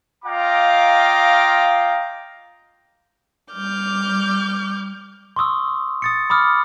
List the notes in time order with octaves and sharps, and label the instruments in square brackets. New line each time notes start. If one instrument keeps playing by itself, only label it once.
[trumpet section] F4 D#5 F5 G5 A#5 D6
[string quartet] G3 D6 F6 G6
[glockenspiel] C6 C#6 D#6 E6
D#6 A6 C#7
B5 D6 D#6 F6